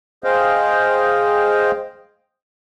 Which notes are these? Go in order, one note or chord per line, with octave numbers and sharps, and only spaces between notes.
G#4 C5 D#5 F5 G5